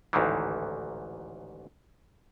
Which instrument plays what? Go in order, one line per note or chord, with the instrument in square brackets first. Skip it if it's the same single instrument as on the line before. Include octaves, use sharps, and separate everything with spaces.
[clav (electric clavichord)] A1 D2 G#2 D#3 E3